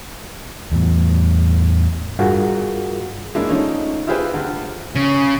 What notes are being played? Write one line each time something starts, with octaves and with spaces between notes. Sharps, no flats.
E2 A2
G2 F4 F#4 G#4 A#4
G#3 A#3 D4 E4
F3 A3 C#4 D#4
E4 F4 G4 G#4 B4 C5
D2
C#3